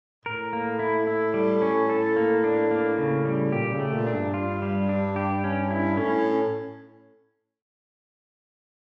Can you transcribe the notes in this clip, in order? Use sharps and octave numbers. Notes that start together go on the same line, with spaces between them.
A2 A#4
A#3
E4
E4
G3
C#4
A4
A#3
D4
A#3
C#3
G3
A#2 G4
C#3
A3
A#2
D4
G2
F4
G3
D4
G4
C#4
E4
A2 C#4